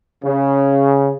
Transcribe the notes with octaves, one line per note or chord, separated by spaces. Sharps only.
C#3